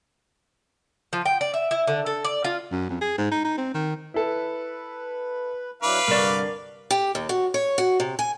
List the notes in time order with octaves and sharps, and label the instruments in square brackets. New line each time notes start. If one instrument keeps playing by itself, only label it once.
[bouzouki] F3
G5
D5
E5
E4
D3
A4
D5
F4
[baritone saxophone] F#2
F2
G#4
G#2
D#4
D#4
C4
D#3
[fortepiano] E4 A4 [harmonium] B4
[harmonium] F#3 D4 E4 [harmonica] B4 F5 D6
[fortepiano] C2 C#6 [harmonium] G2 D3 [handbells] A#4 D5
[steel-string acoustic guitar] G4
D#2
F#4
C#5
F#4
C3
G#5